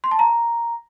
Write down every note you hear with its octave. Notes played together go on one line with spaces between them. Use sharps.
C6
A5
A#5